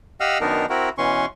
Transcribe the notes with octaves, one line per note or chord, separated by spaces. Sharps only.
G4 D#5 F5 F#5 E6 F6
F#2 D#3 B3 D4 D#4 A#4
C4 E4 F#4 A#4
B2 E3 C#4 C6 C#6